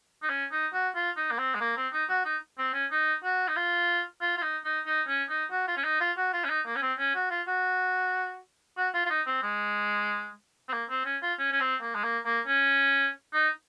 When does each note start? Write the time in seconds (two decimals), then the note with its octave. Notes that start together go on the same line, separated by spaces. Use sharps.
0.23 D#4
0.30 C#4
0.52 D#4
0.73 F#4
0.95 F4
1.17 D#4
1.31 A#3
1.39 C4
1.55 G#3
1.61 A#3
1.77 C4
1.93 D#4
2.10 F#4
2.25 D#4
2.58 C4
2.74 C#4
2.91 D#4
3.24 F#4
3.48 D#4
3.56 F4
4.21 F4
4.37 F4
4.42 D#4
4.65 D#4
4.86 D#4
5.08 C#4
5.29 D#4
5.51 F#4
5.68 F4
5.77 C#4
5.84 D#4
6.00 F4
6.17 F#4
6.33 F4
6.44 C#4
6.49 D#4
6.66 A#3
6.76 C#4
6.82 C4
6.99 C#4
7.15 F#4
7.31 F4
7.47 F#4
8.77 F#4
8.94 F4
9.06 F4
9.10 D#4
9.27 C4
9.42 G#3
10.69 C4
10.73 A#3
10.90 C4
11.05 C#4
11.22 F4
11.39 C#4
11.52 C#4
11.60 C4
11.82 A#3
11.95 G#3
12.04 A#3
12.25 A#3
12.47 C#4
13.33 D#4